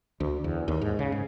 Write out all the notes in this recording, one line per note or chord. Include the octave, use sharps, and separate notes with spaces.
D2
E2
D#2
G#2
C#3
G#2